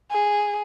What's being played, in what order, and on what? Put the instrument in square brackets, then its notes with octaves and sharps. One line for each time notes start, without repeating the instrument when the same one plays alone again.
[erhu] G#4